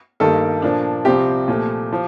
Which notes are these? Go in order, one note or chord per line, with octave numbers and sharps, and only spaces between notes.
G2 D#3 G3 A#3 A4
A#2 F3 A#3 D4
C2 C3 F3 C4 G4
A#2 F3 A3
F3